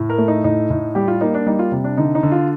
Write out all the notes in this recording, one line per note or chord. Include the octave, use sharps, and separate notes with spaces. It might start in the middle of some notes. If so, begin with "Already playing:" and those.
Already playing: A2
A#4
A3
D#4
A2 D#4
A2
G3 G4
F4
A#3 D#4
D4
G3 D#4
F4
C3
D4
D3 D#4
D#4
D3
F4